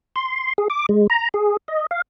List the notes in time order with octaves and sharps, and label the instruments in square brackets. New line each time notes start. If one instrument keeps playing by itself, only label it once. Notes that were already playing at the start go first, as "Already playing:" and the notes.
[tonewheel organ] C6
G#4
D6
G#3
A#5
G#4
D#5
F5